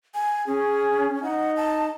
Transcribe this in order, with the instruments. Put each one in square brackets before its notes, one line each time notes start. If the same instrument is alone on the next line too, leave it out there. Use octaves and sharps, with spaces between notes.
[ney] G#5
[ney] C#4 [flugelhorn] G#4
[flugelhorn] D#4 [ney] F#5
[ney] A5